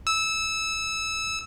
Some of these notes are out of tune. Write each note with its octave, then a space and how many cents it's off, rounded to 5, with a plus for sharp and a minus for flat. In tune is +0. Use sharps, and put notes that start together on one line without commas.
E6 -15